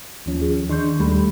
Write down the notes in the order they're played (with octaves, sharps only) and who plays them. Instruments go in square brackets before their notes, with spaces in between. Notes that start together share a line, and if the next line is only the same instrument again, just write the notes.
[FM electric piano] D#2 F3 C#4
[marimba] G#4
[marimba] D#3 G6 [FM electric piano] D4 C6 C#6
[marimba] D#2 B5 [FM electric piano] G3 A3